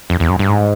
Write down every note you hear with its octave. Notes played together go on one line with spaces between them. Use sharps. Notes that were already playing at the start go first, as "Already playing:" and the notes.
F2
E2
F#2
G2
G#2